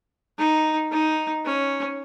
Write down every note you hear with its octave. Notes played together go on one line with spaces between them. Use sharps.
D#4
D#4
C#4